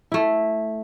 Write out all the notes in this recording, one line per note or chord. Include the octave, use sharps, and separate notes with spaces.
A3 E4